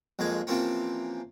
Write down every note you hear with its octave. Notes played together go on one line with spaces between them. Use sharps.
A#1 F2 G#3 A#3 G#5
C3 E3 F3 A#3 C4 C#4